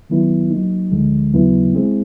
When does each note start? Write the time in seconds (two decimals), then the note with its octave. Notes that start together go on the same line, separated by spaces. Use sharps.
0.10 D#3 F#3 B3 E4
0.50 F#3 A#3 D#4
0.91 D2 D3 F3 G#3
1.32 D#2 C#3 F#3 B3 E4
1.74 G#3 C4 E4 G#4